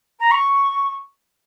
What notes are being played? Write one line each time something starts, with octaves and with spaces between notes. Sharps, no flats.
A#5
C#6